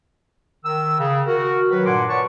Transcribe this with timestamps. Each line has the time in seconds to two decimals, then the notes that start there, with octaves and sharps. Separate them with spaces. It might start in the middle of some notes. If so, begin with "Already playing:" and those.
0.65 D#3 E6
0.99 C#3
1.26 F#4 A#4
1.70 D#3 F#3 B4
1.86 G2 A#2 F#5 G#5 C6 D6
2.09 B4 C#5 D5 F#5 A5 C#6